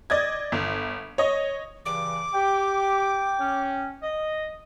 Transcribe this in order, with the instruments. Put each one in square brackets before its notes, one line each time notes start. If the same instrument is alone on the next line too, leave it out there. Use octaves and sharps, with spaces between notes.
[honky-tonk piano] D5 D#5 G#6
G1
C#5 D#5
[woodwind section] G2 C#3 E3 [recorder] D6
[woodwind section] G4 [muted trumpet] G5
[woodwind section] C#4
D#5